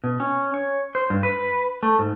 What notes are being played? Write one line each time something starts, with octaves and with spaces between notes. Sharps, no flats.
B2
C#4
C#5
C5
G2
B4
A3
G#2